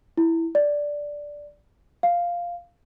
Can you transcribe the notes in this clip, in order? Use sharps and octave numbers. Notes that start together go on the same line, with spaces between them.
E4
D5
F5